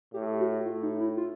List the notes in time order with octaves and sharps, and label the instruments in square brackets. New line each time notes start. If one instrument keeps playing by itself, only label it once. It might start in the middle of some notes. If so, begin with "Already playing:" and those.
[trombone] A2 [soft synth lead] G4
[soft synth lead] F#4
[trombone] A2 [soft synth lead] F4
[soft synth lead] D#4
E4
F4